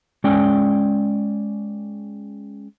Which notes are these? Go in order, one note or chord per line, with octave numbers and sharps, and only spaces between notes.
G#3 C#4 D5 G5 G#5